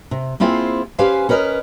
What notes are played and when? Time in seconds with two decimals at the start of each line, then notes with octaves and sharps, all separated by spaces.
0.11 C3
0.40 A#3 C4 E4 F4 G#4 C5
0.98 C#4 G4 B4 C5 F5 G#5
1.29 C#4 A#4 B4 D5 D#5